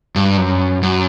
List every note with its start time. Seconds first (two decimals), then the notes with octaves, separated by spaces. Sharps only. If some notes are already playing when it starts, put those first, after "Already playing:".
0.16 G2
0.38 F#2
0.83 F#2